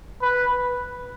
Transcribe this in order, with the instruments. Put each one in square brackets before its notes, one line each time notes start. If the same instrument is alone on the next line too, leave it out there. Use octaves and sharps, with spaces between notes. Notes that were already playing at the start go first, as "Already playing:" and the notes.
[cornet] B4